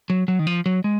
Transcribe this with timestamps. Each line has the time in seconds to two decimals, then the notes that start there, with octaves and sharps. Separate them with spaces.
0.10 F#3
0.28 F#3
0.39 D#3
0.47 F3
0.66 F#3
0.84 G#3